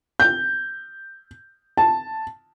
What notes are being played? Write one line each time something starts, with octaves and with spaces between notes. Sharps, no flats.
G6
A5